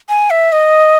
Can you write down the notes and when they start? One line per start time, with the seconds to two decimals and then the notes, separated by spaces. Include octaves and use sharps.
0.09 G#5
0.30 E5
0.52 D#5